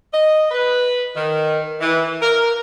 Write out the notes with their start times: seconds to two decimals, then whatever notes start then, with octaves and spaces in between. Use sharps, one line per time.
0.13 D#5
0.51 B4
1.14 D#3
1.80 E3
2.21 A#4